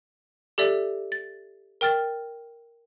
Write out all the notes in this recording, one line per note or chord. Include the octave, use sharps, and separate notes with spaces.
G4 A4 D5 E5
A6
A#4 G5 F6 A6